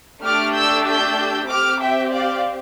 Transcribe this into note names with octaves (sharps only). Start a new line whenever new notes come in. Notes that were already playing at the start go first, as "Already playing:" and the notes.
A3 D4 G4 D6 F6
E6 G6
E6 G6
C4 G4 D6 F6
E5 G5
D5 F5